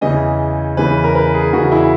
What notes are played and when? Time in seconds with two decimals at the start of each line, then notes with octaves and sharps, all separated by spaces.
0.01 E2 C#3 E3 D#5
0.77 E2 C#3 E3 B4
1.04 A#4
1.15 B4
1.34 G#4
1.52 E2 C#3 E3 F#4
1.72 E4